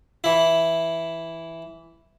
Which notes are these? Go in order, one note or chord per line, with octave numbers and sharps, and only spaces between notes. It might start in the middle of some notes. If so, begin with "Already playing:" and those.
E3 E4